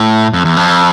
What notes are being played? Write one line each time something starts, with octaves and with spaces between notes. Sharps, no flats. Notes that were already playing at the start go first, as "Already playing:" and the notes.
Already playing: A2
F2
E2
F2